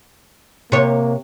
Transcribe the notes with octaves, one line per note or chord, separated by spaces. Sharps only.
C3 A#3 C#5